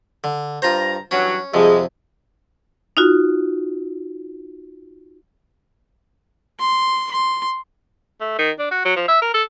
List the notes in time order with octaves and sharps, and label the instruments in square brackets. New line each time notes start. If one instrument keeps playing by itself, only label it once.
[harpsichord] D3
[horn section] G2 A#5 [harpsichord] F4 C5
[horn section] G2 E3 F#3 [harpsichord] C#4
[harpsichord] F2 C3 [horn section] F3 G3 G#3 [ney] G#4
[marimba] D#4 F4 F#4
[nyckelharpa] C6
C6
[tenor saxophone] A3
D#3
D4
F#4
F#3
F3
E5
A#4
A4